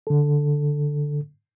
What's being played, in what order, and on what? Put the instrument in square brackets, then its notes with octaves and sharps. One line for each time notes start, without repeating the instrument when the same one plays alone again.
[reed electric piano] D3 A4